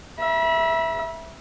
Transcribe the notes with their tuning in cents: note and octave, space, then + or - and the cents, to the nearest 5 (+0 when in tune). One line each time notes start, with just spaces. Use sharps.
E5 +0 B5 -40